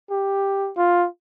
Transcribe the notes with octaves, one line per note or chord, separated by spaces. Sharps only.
G4
F4